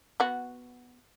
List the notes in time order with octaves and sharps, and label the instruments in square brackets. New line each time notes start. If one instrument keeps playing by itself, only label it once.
[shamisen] B3 F#4